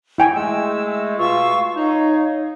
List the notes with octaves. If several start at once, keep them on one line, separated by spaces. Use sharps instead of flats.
E4 G5 G#5
G#3 A3 E6
B2 F4 F5 C#6 E6
D#4 C#5 F5